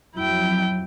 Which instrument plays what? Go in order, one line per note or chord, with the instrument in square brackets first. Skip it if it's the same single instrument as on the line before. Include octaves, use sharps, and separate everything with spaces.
[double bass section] F2 F#3 [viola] E4 G5